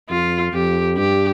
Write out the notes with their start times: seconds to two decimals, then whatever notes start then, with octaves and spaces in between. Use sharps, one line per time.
0.09 F2 F4
0.53 F2 G4
0.97 G2 G4